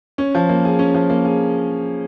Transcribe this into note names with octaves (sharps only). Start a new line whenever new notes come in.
C#4
F3
A#3
G#4
C#4
F3
A#3
G#4